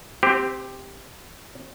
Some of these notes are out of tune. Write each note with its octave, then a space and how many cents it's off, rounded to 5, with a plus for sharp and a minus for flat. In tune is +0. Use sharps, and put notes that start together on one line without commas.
C4 +0 G4 +5 C5 -30